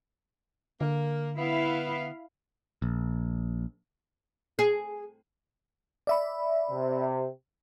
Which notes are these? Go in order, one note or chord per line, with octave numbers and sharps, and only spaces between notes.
D3 A#3
B3 E4 F5
A#1
G#4
D5 E5 B5
C3